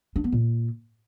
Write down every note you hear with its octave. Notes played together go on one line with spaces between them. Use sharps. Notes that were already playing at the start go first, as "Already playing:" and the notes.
D4
B3
A#2